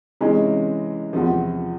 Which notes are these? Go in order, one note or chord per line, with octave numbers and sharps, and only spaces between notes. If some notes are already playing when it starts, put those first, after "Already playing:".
C3 E3 G#3 C#4
E2 C3 F3